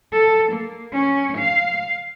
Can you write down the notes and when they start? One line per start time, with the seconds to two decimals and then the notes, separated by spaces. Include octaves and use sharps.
0.12 A4
0.53 A#3
0.93 C#4
1.38 F5